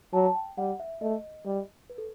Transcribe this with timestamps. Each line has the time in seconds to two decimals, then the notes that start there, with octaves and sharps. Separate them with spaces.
0.13 F#3 A5
0.26 A5
0.35 G5
0.58 G3 F#5
0.80 E5
1.01 A3 D#5
1.46 G3
1.90 B4
1.98 A4